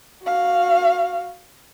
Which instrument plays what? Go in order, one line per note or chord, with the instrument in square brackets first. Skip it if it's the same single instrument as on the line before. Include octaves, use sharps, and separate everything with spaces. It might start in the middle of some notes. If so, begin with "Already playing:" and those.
[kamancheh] F#4 F5